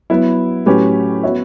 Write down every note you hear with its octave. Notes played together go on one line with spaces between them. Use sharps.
F#3 B3 E4
A2 F#3 C#4 G4 B4
B3 F#4 C#5 E5